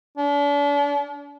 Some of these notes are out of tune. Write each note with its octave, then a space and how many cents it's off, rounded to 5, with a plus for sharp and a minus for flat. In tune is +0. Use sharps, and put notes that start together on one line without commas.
D4 -40